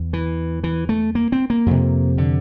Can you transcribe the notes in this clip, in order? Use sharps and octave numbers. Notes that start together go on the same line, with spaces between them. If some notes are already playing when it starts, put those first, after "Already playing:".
Already playing: E2
E3
E3
A3
A#3
C4
A#3
F2 C3
D3